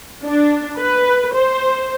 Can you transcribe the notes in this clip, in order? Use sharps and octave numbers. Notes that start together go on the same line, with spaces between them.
D4
B4
C5